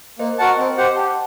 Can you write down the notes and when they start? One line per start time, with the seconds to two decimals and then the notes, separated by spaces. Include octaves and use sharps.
0.19 A#3 C5 D#5
0.39 F#4 A#4 F#5 A5
0.58 C4 D#5 G5
0.77 G4 C5 F#5
0.96 G4 F#5 A5